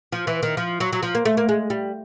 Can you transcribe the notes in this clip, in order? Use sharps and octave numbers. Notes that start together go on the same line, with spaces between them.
F3
E3
D#3
F3
F#3
F#3
F3
A#3
A3
A#3
G#3
G3